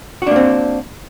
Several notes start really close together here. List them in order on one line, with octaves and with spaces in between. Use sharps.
F#4 D4 A#3 C4